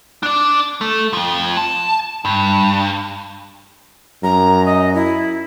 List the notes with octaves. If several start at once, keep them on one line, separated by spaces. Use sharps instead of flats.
D4 D5
A3
F2 F3
A5
G2
F#2 A#5
D#5
E4